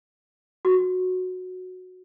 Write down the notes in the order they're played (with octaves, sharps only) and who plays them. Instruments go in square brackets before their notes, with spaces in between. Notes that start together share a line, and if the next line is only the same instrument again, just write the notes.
[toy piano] F#4